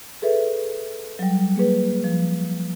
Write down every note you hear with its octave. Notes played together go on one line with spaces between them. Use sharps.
G#4 A4 B4 E5
F#3 G3
A#3 G#4 B4
F3